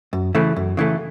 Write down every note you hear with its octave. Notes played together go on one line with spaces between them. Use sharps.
F#2
C#3 E3 A3
F#2
C#3 E3 A3